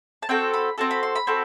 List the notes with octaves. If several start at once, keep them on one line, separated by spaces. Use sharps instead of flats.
A5
C4 F#4 A4 G5
B5
C4 F#4 A4 A5
B5
C6
B5
C4 F#4 A4